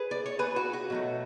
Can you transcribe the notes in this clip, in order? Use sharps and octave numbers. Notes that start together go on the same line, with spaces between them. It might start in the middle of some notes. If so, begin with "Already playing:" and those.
Already playing: G#4 B4
D5
C#5
G#4 B4
F#4
F#4
B2 F#3 A3